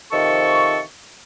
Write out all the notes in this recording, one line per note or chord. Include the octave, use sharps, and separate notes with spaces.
C3 D#3 F3 A4 C#6